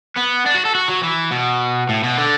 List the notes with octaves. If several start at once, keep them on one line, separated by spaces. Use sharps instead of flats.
B3
D4
F#4
A4
F#4
F#3
E3
B2
A2
B2
D3